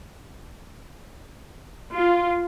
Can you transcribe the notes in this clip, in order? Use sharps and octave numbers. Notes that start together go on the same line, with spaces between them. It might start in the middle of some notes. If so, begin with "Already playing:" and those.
F4